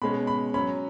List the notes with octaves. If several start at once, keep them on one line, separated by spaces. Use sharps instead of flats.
B2 G#3 C#4 B5
B5
F#3 C#4 B5